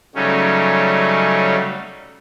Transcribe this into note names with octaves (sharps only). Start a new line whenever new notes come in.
C#3 F#3 G3 A3 C#4 D#4